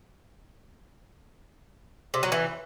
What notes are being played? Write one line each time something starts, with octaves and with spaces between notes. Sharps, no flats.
C3
F#3
E3